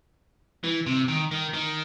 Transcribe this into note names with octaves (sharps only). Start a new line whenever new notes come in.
E3
C3
D#3
D#3
D#3